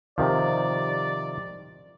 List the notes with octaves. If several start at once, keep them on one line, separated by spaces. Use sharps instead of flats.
C3 D#3 F3 D5